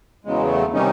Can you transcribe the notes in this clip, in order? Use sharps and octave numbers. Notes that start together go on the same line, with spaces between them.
E2 C#3 F#3 G#3
A3
C3 D#3 G3 C#4 D#4